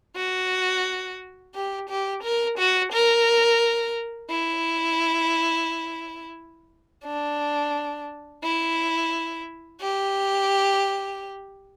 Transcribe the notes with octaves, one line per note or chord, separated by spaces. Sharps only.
F#4
G4
G4
A#4
F#4
A#4
E4
D4
E4
G4